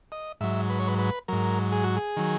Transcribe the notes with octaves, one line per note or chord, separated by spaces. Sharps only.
D#5
G#2 F#3 E5
B4
C#5
B4
B4
G#2 F#3 A#4
G#4
F#4
G#4
D#3 F#3